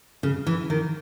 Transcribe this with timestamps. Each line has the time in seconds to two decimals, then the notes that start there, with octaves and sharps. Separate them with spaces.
0.23 C#3
0.47 E3
0.70 D#3